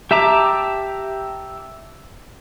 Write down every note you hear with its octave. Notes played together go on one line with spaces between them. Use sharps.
G4 E5 A5 A#5 D6